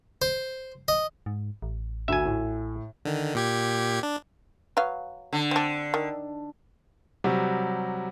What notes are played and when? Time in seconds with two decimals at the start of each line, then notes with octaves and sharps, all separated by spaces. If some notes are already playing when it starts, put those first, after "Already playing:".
0.22 C5
0.88 D#5
1.26 G#2
1.62 A1
2.08 D2 E5 G#5
2.25 A2
3.05 D3 D#3
3.35 A#2 G4 G#6
4.03 D4
4.77 F#3 B4 F5
5.33 D3
5.51 C4 D4
5.94 D#3
7.24 C3 F#3 G3 F#4